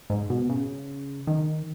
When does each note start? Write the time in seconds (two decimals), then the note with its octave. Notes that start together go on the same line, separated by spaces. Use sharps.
0.10 G#2
0.30 B2
0.49 C#3
1.27 D#3